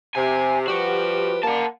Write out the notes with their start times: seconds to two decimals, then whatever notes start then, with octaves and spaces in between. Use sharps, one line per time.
0.15 C3 G#5
0.68 F3 G3 F#4 G4 B4
1.43 A#3 F#5 A5